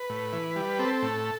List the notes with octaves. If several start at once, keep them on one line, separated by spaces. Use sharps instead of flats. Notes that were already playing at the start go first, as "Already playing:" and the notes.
Already playing: B4
A2
E3
G3
C4 A4
A2